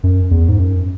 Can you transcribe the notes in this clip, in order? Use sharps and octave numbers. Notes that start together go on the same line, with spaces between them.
F#2
E2
G#2
F#2